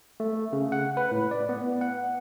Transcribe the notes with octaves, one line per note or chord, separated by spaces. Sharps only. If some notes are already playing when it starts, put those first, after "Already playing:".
A3
C#3
F#5
B4
A2
D5
B3
F#5